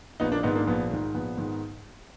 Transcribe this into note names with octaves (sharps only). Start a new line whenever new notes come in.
A#1 B3 D#4
A#3 D4
G#2 D#3 B3 D#4
A#3 D4
A#1 B3
G#2 D#3
A#1 B3
G#2 D#3